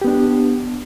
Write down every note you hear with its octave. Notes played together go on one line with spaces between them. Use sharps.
B3 D4 G4